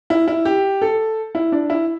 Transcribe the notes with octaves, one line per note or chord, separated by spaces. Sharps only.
E4
E4
G4
A4
E4
D4
E4